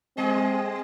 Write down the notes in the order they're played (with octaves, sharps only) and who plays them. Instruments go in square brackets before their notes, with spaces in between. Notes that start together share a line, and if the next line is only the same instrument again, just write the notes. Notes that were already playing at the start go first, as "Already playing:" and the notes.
[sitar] G3 G#4 D#5 [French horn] C4